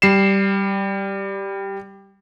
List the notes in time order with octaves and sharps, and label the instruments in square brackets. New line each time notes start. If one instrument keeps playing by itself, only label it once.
[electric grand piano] G3 C7 E7